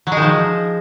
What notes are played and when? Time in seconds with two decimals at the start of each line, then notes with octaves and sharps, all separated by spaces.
0.07 F#3
0.12 G#3
0.17 D#3
0.22 F3